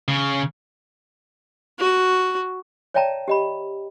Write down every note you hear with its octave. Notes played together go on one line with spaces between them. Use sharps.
C#3
F#4
C#5 D5 E5 G5 A5 A#5
G4 D#5 B5